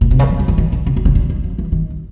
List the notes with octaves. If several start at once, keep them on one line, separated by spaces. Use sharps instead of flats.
A#2
C3
C#3
F3
F3
E3
D#3
D3
C#3
D3
C#3
D3
D#3
F3
E3
D#3